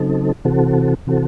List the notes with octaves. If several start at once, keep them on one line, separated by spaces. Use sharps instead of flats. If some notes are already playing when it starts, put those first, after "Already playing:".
Already playing: C#3 F#3 C4 D#4 A4
C3 E3 C4 F#4 A4
C3 E3 C4 F#4 A4